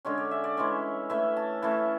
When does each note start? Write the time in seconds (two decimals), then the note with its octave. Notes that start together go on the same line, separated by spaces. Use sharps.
0.05 D3 G#3 C#4 C#5
0.18 D5
0.31 E5
0.44 D5
0.57 E3 G#3 C#4 C#5
1.10 E3 A3 C#4 E5
1.36 A5
1.62 E3 A3 C#4 A5